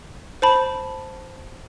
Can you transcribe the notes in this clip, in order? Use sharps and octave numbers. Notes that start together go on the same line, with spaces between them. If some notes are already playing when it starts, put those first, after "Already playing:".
C5 A5 B5